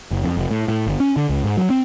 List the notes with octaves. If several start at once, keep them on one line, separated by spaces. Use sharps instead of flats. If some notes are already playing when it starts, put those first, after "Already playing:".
F#1
F2
F1
A2
A2
G1
C#4
D3
C#2
G#2
F#3
C4